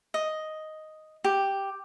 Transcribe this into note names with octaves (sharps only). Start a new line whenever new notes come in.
D#5
G4